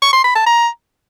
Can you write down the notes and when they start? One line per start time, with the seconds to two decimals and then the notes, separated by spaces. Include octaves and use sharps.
0.02 C#6
0.13 C6
0.24 B5
0.35 A5
0.46 A#5